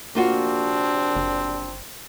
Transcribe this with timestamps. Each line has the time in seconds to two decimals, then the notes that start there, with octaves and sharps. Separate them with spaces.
0.15 A#1 C3 A#3 C4 D4 F4 F#4
1.16 F#1